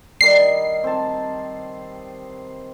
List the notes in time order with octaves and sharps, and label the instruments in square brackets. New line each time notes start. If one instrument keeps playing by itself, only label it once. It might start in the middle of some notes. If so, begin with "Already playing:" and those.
[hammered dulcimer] D#3 G3 [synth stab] C7
[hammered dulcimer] C4 A5